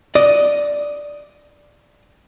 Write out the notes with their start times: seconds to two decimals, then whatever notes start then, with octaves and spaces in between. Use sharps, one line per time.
0.15 D5 D#5